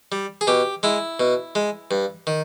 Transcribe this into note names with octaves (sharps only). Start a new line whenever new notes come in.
G3
G#4
B2 G4
G#3 E4
B2
G#3
G2
D#3